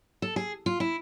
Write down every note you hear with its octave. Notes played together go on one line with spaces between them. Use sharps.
A4
G#4
F4
E4